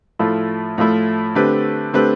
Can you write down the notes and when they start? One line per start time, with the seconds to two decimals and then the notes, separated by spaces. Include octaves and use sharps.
0.19 A2 F3 A3 E4
0.78 A2 F3 A3 E4
1.35 D3 A3 C4 G4 B4
1.93 D3 A3 C4 G4 B4